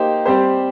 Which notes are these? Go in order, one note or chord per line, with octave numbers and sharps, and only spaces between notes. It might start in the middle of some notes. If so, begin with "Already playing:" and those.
Already playing: A#3 D#4 G4 C5
G3 C4 G4 C5